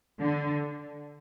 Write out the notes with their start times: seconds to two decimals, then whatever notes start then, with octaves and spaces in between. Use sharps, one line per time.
0.21 D3